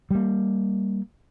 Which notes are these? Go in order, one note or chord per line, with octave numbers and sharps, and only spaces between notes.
G3 A#3